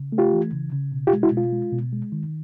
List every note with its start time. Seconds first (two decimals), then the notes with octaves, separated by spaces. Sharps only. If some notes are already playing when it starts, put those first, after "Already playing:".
Already playing: C#3
0.12 A3
0.18 F4 G4
0.33 E3
0.53 C#3
0.73 C#3
0.92 B2
1.07 F4 G4
1.13 G#3
1.23 E4 F#4
1.32 B2 F4
1.52 G#3
1.72 B2
1.93 G#3
2.12 D#3